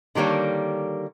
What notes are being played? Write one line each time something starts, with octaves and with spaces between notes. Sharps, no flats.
D3 D#3 G3 A#3 C#5